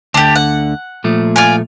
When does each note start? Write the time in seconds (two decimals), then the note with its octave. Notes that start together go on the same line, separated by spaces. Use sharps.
0.14 D2 D3 D4 G4
0.35 F#5
1.04 A#2 F3 A3
1.36 F4 D5 G#5